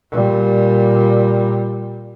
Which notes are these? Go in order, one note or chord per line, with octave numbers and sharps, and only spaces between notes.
A#2 G3